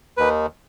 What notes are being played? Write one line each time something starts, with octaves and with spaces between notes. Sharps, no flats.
D#2 D#3 B4